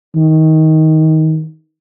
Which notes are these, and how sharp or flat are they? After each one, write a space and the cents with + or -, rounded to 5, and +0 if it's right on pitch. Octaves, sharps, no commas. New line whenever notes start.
D#3 +20